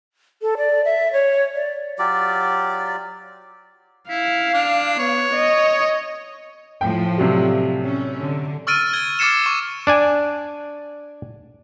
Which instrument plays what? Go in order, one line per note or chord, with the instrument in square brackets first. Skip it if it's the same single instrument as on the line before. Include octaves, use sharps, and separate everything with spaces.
[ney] A4
D5
E5
C#5
D5
[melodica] F#3 F4 G4 D5
[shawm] E4 [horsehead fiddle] F5
[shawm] D4
[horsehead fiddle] B3 [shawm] C#5
[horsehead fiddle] D#5
[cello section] A2 F3 [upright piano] G5
[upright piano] C3 F#3 G3
[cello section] C#4
D3
[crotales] C#6 E6 F6 A6 D7 D#7
G#6 G7
D6 F6 A6 C7 C#7 E7
C#6
[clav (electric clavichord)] D4 D5 G#5